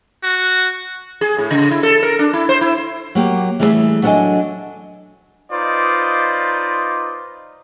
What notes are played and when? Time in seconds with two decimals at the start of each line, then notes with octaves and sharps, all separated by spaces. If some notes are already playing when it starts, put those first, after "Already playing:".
0.23 F#4
1.21 G#4
1.38 A2
1.51 C#3
1.71 E4
1.83 A4
2.02 A#4
2.19 D4
2.33 E4
2.49 C5
2.61 E4
3.15 F#3 A#3 G4
3.60 E3 G3 A3 G#4 B4 E5
4.03 F#3 D4 A4 A#4 D#5 G#5
5.52 D#4 F4 B4 C5 D5 D#5